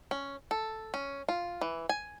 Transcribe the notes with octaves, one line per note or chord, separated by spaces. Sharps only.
C#4
A4
C#4
F4
E3
G#5